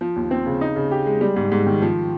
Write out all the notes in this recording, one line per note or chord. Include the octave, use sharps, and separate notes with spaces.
F3
D#2
C4
C#3
D#4
C#3
G4
G#3
G3
G#2
G#2
D#3
F3